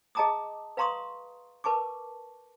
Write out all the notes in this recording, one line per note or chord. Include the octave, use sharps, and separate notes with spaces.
G#4 D#5 A5 A#5 D6 D#6
B4 F5 A#5 C6 C#6 D#6
A#4 B4 A5 C#6 D6